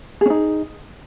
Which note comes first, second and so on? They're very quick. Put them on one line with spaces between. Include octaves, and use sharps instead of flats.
G#4 C#4 D#4